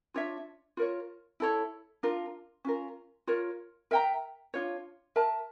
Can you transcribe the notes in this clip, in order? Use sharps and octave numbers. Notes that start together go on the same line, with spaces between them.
D4 F4 C#5 E5
F4 A#4 C#5
E4 A4 C#5
D4 F4 A#4
C#4 F4 A#4
F4 A#4 C#5
A#4 E5 G5 A#5
D4 F4 C#5
A#4 E5 A5